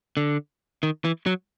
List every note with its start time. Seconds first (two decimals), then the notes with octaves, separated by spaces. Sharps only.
0.17 D3
0.83 D#3
1.05 E3
1.26 F#3